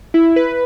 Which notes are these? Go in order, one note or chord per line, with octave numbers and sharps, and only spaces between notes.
E4
B4